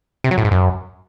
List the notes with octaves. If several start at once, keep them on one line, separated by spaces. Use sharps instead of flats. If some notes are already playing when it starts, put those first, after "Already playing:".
C3
F#3
A2
G#2
F#2